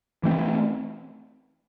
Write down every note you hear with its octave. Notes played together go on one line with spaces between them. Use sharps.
E3 A3 C4